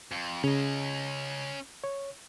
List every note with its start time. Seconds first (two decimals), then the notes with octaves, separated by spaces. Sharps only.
0.11 F2
0.44 C#3 C#4 D#5
1.84 C#5